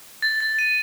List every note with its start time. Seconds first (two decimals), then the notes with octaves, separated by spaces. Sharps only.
0.22 A6
0.40 A6
0.59 D#7